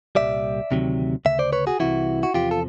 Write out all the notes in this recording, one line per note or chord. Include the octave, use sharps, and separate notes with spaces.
C2 A#2 G3 D5 E5
D2 C3 D#3 F#3
D2 C#3 E5
C5 D5
B4 C#5
F#4 G#4
C2 C3 E3 E4 F#4
F#4
E2 C3 F3 F4 G4
A4